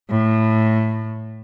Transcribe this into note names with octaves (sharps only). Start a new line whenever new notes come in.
A2